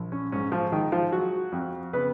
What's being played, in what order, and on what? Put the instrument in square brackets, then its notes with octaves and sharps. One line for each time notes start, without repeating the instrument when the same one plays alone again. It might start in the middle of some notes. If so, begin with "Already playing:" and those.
Already playing: [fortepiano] A#1
C#4
G#2 C#4
F3 F4
D#3 G#3 D#4
F3 F4
F#3 G#3 F#4
F2
C#3 B3 B4